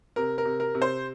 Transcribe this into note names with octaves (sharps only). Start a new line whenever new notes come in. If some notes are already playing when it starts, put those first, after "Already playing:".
C3 A#4
A#4
C3
A#4
C3
C5